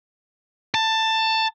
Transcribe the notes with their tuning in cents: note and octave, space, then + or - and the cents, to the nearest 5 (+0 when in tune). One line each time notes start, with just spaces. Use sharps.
A5 +15